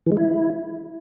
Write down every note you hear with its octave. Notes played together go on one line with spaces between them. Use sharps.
E3
G#3
E4